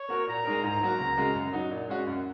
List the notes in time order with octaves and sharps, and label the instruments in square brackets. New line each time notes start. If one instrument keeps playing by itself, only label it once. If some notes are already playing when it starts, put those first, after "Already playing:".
Already playing: [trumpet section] C#5
[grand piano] A#3 F#4 A#4
[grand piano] A#2 [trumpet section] A#5
[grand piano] G#3 D#4 A#4
[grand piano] G#2 [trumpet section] A#5
[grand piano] F#3 A#3 F#4 A#4
C#2
C#3 G#3 F#4 A#4
F#2
F#3 D#4 F#4
A#2
G#3 C#4 F#4
F#2